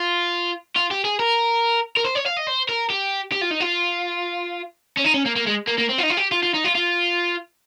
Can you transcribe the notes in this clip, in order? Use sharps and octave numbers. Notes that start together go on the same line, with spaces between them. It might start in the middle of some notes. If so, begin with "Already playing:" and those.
Already playing: F4
F4
G4
G#4
A#4
A#4
C5
C#5
F5
D#5
C5
A#4
G4
G4
F4
D#4
F4
C#4
D#4
C#4
A#3
A#3
G#3
A#3
A#3
C4
F4
D#4
F4
G4
F4
F4
D#4
F4
F4